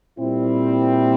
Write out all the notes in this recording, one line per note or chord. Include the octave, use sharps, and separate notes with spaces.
A#2 G3 C4 E4